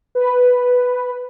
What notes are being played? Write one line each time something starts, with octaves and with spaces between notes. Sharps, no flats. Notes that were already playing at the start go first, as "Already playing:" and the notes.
B4